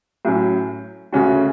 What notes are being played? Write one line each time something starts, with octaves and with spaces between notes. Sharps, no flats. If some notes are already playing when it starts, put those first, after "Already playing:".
A2 F#3 C#4
D2 C#3 G#3 C#4 F#4